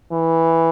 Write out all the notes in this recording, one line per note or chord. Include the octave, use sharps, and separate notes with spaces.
E3